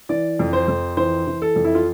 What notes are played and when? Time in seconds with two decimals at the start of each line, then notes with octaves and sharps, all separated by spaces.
0.09 E3 D5
0.39 F2
0.53 C5
0.68 F2
0.97 E3 C5
1.27 E3
1.42 A4
1.56 F2
1.64 E4
1.75 F4